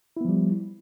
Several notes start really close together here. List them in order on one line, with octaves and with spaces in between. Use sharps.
E4 B3 F3 G3